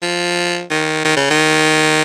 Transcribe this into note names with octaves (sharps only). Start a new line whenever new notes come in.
F3
D#3
D#3
C#3
D#3